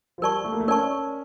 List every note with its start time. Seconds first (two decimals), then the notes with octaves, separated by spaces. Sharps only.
0.18 F3
0.22 G3 A#4 D5 A5 C#6
0.45 A3
0.53 A#3
0.60 A3
0.68 C#4 A#4 D5 A5 C#6